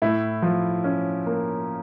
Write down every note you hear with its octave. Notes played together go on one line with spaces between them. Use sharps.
A2 E4
F3
C#4
A#3